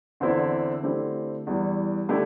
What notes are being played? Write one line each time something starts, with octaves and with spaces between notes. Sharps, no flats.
E2 D3 C4 E4
D3 A3 C4 E4 G4
E2 E3 G3
D3 A3 E4 G4